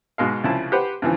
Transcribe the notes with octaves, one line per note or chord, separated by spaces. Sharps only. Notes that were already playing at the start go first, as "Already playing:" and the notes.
G#2 B2 G#3 F5
C2 C#3 F3 E4 A5
G4 B4 C5 F#5
G2 C#3 E3 F3